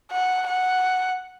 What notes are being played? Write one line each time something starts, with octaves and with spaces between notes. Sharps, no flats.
F#5
F#5